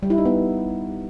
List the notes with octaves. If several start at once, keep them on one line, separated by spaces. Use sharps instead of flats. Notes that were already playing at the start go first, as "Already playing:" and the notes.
G3
E4
D#4
B3